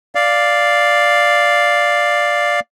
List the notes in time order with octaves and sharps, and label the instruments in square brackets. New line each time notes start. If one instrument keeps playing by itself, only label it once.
[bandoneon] D5 F5